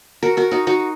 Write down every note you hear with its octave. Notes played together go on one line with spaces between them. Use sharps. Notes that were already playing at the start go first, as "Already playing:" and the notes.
F#4 A#4
F#4 A#4
D#4 F#4
D#4 F#4